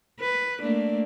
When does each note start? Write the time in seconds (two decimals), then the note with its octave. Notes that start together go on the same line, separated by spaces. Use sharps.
0.20 B4
0.61 A3 A#3 D4